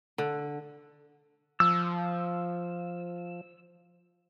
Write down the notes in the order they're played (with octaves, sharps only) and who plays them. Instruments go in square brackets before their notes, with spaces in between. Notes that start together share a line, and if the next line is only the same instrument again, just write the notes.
[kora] D3
[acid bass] F3 [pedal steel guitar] E6